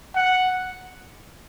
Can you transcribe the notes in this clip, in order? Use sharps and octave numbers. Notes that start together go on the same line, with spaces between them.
F#5